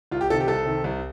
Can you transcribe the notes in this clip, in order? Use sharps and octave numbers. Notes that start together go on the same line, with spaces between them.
C2 F4
G4
C3 D#3 A4
G4
C2 A4
C3 D#3
C2